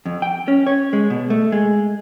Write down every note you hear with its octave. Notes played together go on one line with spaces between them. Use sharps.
F2
G5
C#4
C#5
G#3
B2
A3
G#3